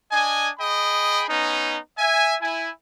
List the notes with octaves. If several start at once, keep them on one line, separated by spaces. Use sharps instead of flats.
D4 D#5 G#5
G#4 D#5 G5 B5
B3 C#4 D#4
E5 G#5
E4 G#5